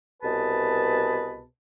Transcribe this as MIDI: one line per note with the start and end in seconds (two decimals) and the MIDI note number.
0.23 1.44 36
0.23 1.44 47
0.23 1.44 68
0.23 1.44 71
0.23 1.44 81